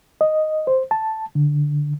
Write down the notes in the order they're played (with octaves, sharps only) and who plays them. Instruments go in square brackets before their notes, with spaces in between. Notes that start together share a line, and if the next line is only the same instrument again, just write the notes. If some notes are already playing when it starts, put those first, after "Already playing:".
[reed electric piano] D#5
C5
A5
D3